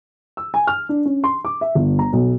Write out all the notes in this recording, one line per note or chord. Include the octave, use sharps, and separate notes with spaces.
E6
G#5
F6
D4
C#4
C6
D6
E5
G1
A#5
B1